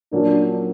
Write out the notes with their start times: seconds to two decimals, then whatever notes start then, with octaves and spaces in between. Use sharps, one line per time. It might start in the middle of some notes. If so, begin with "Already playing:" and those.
0.13 A#2 F#3 A#3 C#4 D4